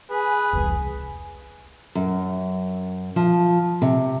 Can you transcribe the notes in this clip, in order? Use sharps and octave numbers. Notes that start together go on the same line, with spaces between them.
G#4 B4 G#5
E1 C2
F#2
F3
C3